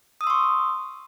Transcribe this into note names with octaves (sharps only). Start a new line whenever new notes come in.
C6 C#6 D#6 E6